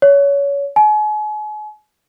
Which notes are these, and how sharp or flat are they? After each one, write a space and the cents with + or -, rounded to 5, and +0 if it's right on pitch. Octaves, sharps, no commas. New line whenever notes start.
C#5 +25
G#5 +40